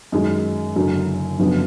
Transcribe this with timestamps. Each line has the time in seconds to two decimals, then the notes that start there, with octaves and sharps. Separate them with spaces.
0.12 F#2 D#3 G#3
0.76 F#1 F#2 D3 F#3
1.39 F#1 F#2 D3 F3 B3